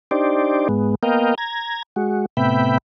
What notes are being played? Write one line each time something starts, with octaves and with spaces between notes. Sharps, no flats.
D4 D#4 G4 C5 D5
G#2 G#3 B3
A#3 B3 A#4 D#5 F5 G5
A#5 G#6
G#3 F#4
A2 C3 B3 E5 G5 B5